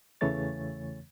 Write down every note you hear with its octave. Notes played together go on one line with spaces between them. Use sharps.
E2 C#3 E3 A3 C#5 A6